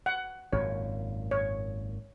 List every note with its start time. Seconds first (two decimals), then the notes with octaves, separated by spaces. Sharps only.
0.06 F#5
0.53 G#1 F#2 A#2 C#5
1.31 C#5